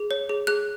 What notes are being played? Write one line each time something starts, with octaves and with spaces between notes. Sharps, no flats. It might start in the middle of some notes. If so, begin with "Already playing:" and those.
Already playing: G#4
C#5
G#4
G#4 F#6